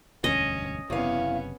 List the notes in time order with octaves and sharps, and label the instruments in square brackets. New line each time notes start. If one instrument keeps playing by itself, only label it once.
[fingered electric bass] E1 D2 G2 [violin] C#4 [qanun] D#5
[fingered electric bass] F#1 C3 [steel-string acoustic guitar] E2 F5 [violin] B3 C#4